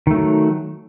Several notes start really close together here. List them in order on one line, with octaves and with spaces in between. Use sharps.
D#3 A3 F#3